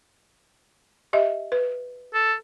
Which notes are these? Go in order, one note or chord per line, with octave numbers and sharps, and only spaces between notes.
G4 D#5 E5
B4
A4